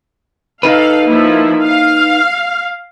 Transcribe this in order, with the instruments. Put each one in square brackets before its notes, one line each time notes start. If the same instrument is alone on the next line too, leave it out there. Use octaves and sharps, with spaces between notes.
[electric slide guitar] D#4 B4 [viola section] A4 F5
[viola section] F3 A#3 E4
F5